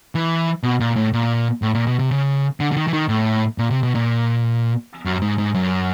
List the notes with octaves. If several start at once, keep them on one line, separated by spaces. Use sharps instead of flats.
E3
B2
A#2
A2
A#2
A2
A#2
B2
C3
C#3
D3
D3
D#3
E3
D#3
A2
A#2
C3
B2
A#2
F#2
G#2
G#2
F#2